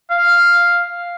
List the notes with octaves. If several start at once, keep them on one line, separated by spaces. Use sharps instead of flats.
F5